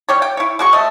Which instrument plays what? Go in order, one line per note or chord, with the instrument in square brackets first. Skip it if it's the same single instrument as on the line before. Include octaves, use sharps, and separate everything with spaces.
[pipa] G3 G4 C#5
G5
E4 C#5
G#3 F#4 C#6
A3 D#5